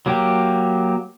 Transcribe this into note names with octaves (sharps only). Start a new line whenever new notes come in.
F#3 A#3 G4